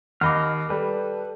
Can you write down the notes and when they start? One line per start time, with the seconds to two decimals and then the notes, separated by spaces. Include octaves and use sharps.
0.21 D#2 D#5 F#5 B5 D6 F6
0.70 G3 A4 B4